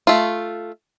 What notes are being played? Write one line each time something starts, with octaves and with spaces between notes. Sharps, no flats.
A3 F4